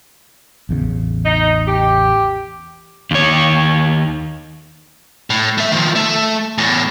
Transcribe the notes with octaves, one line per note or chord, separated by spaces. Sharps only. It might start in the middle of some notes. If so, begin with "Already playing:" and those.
A1 E2 C#3
D#4
G4
D#2 C#5
A2
A3 E5
D#3 F3
A3
E2 A2